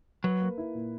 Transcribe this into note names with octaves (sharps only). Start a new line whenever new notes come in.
F#3 B4
A#3
E4
A#2